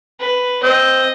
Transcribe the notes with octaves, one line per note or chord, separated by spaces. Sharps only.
B4
C4 D#5